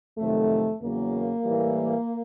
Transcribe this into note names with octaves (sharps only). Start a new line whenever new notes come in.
F2 C3 D#3 F#3 A3
E2 C#3 F#3 A#3
A2 E3 G3